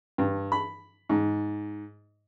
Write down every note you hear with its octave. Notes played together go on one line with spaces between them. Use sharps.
G2
B5
G#2